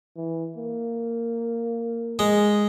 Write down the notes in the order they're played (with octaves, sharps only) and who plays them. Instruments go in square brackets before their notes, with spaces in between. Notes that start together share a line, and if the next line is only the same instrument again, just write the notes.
[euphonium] E3
A#3
[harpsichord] G#3